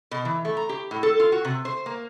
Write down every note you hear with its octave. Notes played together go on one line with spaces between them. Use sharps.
B2
E3
A3
A#5
G4
A2
A4
F4
F#4
C3
C5
A#3